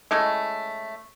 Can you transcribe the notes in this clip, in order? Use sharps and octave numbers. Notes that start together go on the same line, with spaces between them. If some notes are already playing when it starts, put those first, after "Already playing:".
G#3 A3 C#4 E4